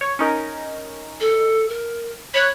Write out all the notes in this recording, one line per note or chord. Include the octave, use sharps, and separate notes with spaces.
C#5
C#4 D#4 A#4
A4
A#4
C#5 B5 C#6 F#6